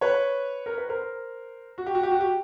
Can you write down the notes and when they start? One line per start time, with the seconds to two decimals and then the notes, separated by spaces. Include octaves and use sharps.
0.01 B4 C#5
0.66 A#4
0.78 B4
0.89 A#4 C5
1.78 F#4
1.86 G4
1.95 F#4
2.03 G4
2.11 F#4
2.21 G4